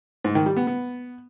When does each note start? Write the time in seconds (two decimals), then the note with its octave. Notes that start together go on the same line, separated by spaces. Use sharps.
0.24 G#2
0.35 D#3
0.46 G3
0.56 B3
0.67 B3